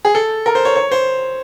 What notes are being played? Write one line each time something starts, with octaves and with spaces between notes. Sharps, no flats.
G#4
A4
A#4
C5
C#5
C#5
C5